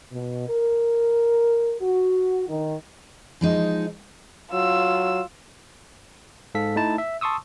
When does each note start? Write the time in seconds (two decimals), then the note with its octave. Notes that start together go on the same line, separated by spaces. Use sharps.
0.12 B2
0.49 A#4
1.82 F#4
2.48 D#3
3.41 F3 G#3 D#4
4.53 F#3 F4 E6
6.55 G#2 A4 F5 B6
6.76 A3 D#4 E4 A5
6.98 E5
7.21 A5 C6 C#6 D#6 E6